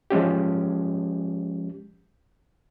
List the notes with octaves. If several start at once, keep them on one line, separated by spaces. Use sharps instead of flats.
F3 G#3 C#4 G4